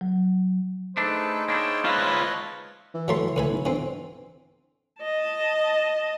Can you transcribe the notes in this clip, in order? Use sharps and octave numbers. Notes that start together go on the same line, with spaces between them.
F#3
A3 D4 D#4 G#4 A4 B4 C5
A#3 D4 E4 C#5 G5 A5
E4 F4 B4 C#5 D#5 A5
E3
F#3 A3 C6
A2 B4 G#5
B1
D3 E3 C4
D#5 A5